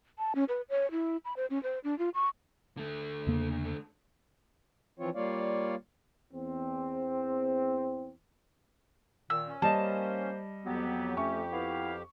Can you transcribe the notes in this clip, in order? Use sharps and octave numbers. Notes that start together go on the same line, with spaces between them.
A5
C#4
B4
C#5
E4
B5
C5
C#4
C5
D4
F4
C#6
D3 A3
E2 C#3 A#3
E3 F3 C4 F4 C#5
G3 A#3 F4 C#5 D5 F5
E2 C4
A#2 D#3 E6
C#4
G3 A#3 C5 D#5 A5
F2 F#3 B3 G4
A3 C#4 C#6
B3 E4 F5